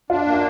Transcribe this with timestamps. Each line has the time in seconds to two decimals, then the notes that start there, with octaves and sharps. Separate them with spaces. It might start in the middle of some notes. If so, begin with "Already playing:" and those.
0.10 D4 F4
0.26 A#3
0.34 F4